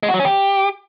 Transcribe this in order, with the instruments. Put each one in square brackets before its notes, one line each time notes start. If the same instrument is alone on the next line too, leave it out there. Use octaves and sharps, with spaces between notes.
[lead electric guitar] G#3
F#4
F#3
C#4
G4